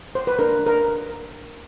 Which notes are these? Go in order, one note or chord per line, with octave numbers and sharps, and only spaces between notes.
C5
B4
D4 A#4
D4
A#4